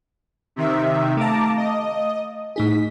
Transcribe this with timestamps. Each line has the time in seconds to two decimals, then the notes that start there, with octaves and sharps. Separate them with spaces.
0.56 C3 D#3 E5
1.17 A3 F5 A5 A#5 D6
1.57 D#5
2.56 A2 D#4 G#4 B6